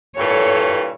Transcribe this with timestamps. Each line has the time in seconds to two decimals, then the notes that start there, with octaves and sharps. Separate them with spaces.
0.17 G2 A#2 E3 A4 C#5